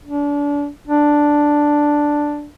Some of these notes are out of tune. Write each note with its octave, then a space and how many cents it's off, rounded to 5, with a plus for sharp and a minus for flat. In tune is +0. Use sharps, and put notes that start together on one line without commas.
D4 -30
D4 +0